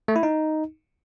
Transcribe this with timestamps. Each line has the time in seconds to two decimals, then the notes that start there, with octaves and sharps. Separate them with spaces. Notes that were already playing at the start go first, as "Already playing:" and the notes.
0.08 A3
0.16 E4
0.23 D#4